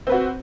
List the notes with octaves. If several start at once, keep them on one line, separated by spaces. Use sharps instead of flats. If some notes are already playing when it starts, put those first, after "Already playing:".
C4 F#4 B4